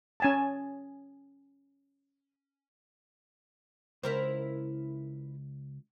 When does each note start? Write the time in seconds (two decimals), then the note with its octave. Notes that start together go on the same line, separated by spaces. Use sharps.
0.20 C#4 G#5 A5
4.03 C#2 E4 A#4 C5